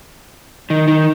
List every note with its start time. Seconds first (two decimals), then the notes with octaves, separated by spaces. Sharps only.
0.70 D#3
0.88 D#3